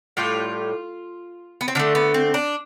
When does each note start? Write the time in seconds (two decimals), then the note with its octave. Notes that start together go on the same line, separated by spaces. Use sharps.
0.17 A2 G3 F4
1.61 B3
1.68 C4
1.75 D3 F3 D4
1.79 A3
1.95 B3
2.14 C4
2.34 D4